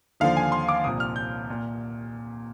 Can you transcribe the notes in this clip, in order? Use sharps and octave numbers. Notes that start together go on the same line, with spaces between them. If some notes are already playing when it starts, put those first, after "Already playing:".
D#2 D3 F3 F5
G#5
C6
D6
C2 A#2 F3 D#6
F6
G6
A#2